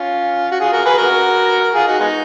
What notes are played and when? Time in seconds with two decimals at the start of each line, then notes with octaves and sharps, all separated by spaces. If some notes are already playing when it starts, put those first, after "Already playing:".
Already playing: C#4 F4
0.52 F#4
0.60 F4 G#4
0.72 F#4 A#4
0.86 G#4 B4
0.98 F#4 A#4
1.74 F4 G#4
1.87 D#4 F#4
2.00 G#3 B3 D#4